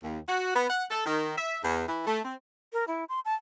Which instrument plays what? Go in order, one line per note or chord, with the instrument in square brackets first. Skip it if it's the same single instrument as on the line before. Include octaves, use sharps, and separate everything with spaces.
[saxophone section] D#2
F#4
B3
F#5
A4
D#3
E5
E2
E3
A3
C4
[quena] A#4
E4
C6
A5